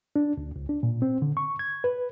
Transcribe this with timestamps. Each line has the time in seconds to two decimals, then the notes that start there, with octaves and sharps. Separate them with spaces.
0.16 D4
0.37 D2
0.56 C#2
0.69 D4
0.83 A#2
1.02 C4
1.22 D3
1.37 C#6
1.59 G#6
1.84 B4